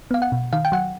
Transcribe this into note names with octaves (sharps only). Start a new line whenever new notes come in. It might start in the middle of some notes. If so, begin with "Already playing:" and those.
B3 F5
F#5
B2
D#3 F5
G5
F#3 F#5